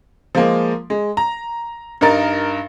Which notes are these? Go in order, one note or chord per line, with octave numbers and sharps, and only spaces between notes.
F3 G#3 A#3
G#3
A#5
G2 D#4 A#4 A6